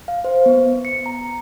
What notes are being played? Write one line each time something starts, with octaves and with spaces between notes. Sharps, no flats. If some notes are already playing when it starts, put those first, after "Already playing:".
F5
C5
B3
C#7
A#5